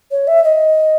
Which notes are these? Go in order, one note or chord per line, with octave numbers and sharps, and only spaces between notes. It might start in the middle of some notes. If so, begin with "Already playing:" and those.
C#5
E5
D#5